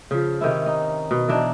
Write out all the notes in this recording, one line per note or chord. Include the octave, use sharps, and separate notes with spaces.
C#3 F3
C3 D#3 C#4 E4
D#4
B2
E3 F#3 D4 D#4